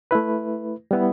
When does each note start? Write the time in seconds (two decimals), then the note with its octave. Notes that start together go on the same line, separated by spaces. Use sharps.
0.11 A3 E4 B4
0.91 G3 B3 E4